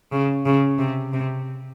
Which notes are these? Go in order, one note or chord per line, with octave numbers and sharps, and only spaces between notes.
C#3
C#3
C3
C3